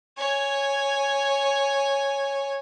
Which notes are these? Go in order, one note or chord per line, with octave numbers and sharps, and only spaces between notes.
C#5 G#5